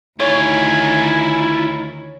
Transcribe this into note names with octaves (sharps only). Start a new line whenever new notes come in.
D2 D#3 E4 F4 C#5 G#5